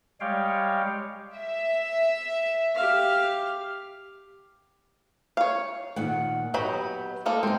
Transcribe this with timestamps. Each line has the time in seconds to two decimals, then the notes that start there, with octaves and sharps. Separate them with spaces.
0.20 G3 G#3 G4 C#5 F5 G5
1.36 E5
2.75 G4 F5
5.37 C#5 F5
5.96 A#2 D#3 F#5
6.54 F#3 B3 G4 D#5 B5
7.26 G#3 A#3 A4
7.43 G#3 C4 D#4